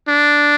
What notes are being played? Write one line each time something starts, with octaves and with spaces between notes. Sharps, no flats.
D4